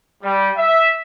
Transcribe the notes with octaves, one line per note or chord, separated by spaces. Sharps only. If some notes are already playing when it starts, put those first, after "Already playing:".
G3
E5